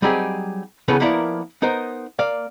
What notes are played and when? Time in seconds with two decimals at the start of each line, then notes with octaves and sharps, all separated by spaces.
0.02 F#3 G3 C4 D#4 G4 G#4
0.88 C#3 E3 B3 C#4 A4 B4
1.00 F3 A#3 B3 E4 A#4 D5
1.62 B3 D#4 A#4 C5
2.19 A#3 D5 F5